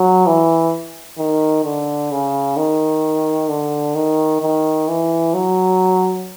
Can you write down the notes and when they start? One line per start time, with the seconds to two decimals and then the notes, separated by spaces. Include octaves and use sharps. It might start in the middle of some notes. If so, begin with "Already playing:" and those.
Already playing: F#3
0.26 E3
1.18 D#3
1.64 D3
2.11 C#3
2.57 D#3
3.49 D3
3.95 D#3
4.41 D#3
4.88 E3
5.34 F#3